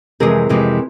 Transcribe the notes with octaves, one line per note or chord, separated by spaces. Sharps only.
F2 C3 E3 G#3 G#4 A#4
F2 C3 E3 G#3